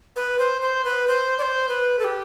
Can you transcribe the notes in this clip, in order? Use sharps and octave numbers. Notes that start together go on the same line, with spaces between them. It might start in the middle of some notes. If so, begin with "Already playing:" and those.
B4
C5
C5
B4
C5
D5
C5
B4
A4
G4